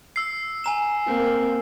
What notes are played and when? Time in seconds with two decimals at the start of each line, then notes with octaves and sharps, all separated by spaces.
0.16 E6 C7
0.64 G#5 A#5 E7
1.07 A#3 C4